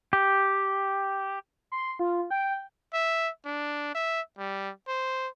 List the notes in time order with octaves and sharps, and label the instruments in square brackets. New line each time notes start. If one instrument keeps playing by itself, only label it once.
[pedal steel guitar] G4
[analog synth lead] C6
F4
G5
[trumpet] E5
D4
E5
G3
C5